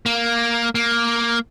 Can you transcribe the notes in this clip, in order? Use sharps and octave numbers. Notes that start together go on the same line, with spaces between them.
A#3
A#3